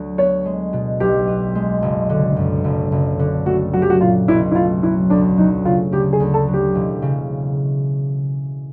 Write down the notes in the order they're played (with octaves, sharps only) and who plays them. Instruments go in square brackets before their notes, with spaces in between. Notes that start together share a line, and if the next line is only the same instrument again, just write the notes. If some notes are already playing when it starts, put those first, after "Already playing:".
Already playing: [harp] D2 F#3
[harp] B3 [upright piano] C#5
[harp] G#3
B2
[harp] B1 [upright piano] G4
[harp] B3
G#3
F#1
D3
F#2
F#1
F#1
D3
[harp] A3 [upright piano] F#4
[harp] F#3 [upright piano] F#4
[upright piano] G4
F#4
[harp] A#2 [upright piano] F4
[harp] B1 [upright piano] E4
[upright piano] E4
[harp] A3 [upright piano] F4
[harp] F#3 [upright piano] E4
[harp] D2 [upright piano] D4
[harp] F#3 [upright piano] D#4
[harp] C#3 [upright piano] F4
[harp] D2 [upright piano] G4
[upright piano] G#4
[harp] D2
[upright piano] A4
[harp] F#3
[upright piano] G4
[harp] E1
C#3